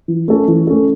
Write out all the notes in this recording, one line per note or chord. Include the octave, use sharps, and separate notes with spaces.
E3
A3 C#4 A4
E3
A3 C#4 A4